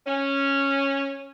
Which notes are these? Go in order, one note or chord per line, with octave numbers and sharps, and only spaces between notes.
C#4